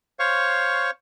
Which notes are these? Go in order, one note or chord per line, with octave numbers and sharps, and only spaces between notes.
C5 C#5 F5 C#6